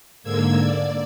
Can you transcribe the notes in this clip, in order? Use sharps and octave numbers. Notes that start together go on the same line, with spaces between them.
G#2 D3 A#3 E6 G#6
D5